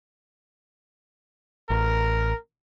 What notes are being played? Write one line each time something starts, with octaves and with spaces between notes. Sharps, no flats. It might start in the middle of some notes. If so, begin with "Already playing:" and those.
A1 A#4